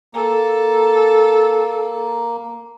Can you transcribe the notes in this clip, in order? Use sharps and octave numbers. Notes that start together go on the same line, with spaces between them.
A#3 A4